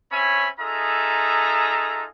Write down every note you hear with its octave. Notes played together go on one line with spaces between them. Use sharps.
C4 C#4 C#5 E5 G#5 B5
D#4 F4 G#4 A4 E5 A#5